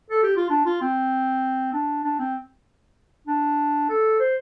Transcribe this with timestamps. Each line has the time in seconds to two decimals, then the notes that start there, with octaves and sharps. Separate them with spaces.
0.10 A4
0.23 G4
0.36 F4
0.50 D4
0.65 F4
0.81 C4
1.73 D4
2.04 D4
2.19 C4
3.27 D4
3.89 A4
4.20 C5